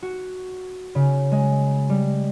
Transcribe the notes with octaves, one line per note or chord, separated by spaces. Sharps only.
F#4
C#3
G#3
G3